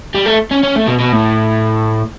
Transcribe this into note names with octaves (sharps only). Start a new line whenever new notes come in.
G3
A3
C#4
C#4
A3
B2
B2
A2